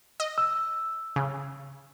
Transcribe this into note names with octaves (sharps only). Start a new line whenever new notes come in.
D#5
E6
C#3